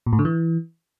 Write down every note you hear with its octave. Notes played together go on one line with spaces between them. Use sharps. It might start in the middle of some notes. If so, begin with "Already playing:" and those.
A#2
A2
D3
E3